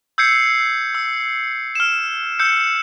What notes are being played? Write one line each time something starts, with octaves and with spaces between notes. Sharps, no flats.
E6 G6 G#6 C7 C#7
E6
F6 E7
E6 G6 C#7